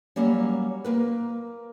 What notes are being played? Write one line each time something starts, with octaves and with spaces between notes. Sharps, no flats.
F#3 G3 A#3 C#4
A#3 A#4 B4